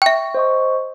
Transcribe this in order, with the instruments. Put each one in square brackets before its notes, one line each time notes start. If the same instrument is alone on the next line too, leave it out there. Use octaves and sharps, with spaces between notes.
[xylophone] E5 G5 [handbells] C#6
[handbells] C5 D#5 C#6